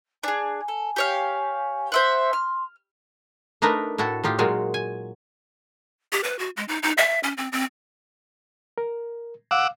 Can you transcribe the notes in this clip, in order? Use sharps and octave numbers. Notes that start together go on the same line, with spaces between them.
D4 G#4 G#5
A4
G4 C#5 F5
C5 E5 F#5 C6
F6
A3 D4 D#4 A#4 B4
A2 E4 F#4 A4
A2 D#4 F4 G4
A#2 F#3 G#3 F4 F#4
G#5
G4
B4
F#4
G#3
D#4
D#4
E5
C#4
C4
C4
A#4
F5 F#5 D6 E6